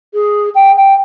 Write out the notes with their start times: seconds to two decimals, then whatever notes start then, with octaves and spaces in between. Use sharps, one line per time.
0.14 G#4
0.55 G5
0.76 G5